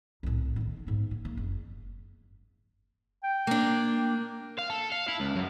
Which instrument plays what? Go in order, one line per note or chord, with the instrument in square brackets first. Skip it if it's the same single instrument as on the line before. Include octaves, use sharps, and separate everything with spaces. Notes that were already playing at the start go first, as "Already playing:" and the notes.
[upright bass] C2 A2
B1 D#3
G#2 B3
A#3
A#3
F#1
[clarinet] G5
[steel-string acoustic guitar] A#3 D4
[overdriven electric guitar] F5
A4
F5
E4
C#2
F#2